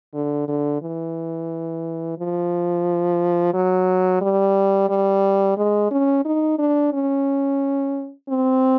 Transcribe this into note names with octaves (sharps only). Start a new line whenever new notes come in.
D3
D3
E3
F3
F#3
G3
G3
G#3
C#4
D#4
D4
C#4
C4